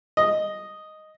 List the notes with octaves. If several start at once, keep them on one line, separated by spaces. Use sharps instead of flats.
D#5